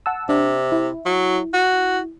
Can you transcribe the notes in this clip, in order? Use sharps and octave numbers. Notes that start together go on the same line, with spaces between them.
F#5 A5 E6
C3 D4
E4
F#3
F#4